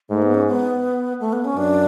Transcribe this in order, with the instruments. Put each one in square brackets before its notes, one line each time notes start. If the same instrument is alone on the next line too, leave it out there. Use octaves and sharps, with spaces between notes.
[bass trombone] G#2 [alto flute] A3
[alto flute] B3
C#4
B3
A3
B3
C#4
[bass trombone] F#2 [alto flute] D4